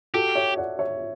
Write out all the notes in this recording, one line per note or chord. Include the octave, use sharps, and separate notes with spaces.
F#4 G4 A4
C#5 E5
D5 F#5
C#5 E5